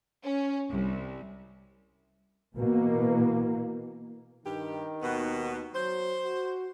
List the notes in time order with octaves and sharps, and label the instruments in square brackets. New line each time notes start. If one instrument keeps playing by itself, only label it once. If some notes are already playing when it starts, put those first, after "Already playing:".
[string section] C#4
C2
[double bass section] B2 E3 A#3 B3
[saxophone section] G2 G4 [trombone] D#3
[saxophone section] D#2 B2 B3
[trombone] F#3 [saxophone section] C5
[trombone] F#4